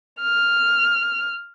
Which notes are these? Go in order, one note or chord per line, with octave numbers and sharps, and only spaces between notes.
F6